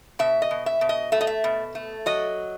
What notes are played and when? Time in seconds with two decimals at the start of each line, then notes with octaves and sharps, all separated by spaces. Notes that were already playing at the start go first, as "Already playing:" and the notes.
0.19 B2 E5
0.42 D#5
0.51 B2
0.66 E5
0.81 B2
0.89 D#5
1.12 A3 E5
1.21 D#5
1.27 E5
1.44 B2
1.75 A3
2.06 F#3 D#5